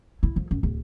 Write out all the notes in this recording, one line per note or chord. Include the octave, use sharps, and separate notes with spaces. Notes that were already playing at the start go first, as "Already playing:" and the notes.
E4
F3
F#2
D1